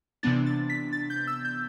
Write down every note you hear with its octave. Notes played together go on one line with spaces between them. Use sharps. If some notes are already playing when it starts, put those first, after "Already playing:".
C3 E3 B3 D4 A6
A6
B6
A6
G6
E6
G6